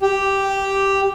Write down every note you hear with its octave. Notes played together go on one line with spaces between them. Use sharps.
G4